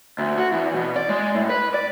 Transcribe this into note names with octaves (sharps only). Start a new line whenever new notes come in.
D2
F#4
E2
B2
D5
G#3
A2
B4
D5